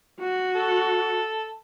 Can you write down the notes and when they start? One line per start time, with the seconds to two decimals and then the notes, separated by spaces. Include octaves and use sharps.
0.20 F#4
0.55 A4